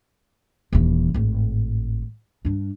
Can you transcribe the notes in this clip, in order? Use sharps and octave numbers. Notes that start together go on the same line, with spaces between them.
D#1 E3
G#1 A2
G2 D4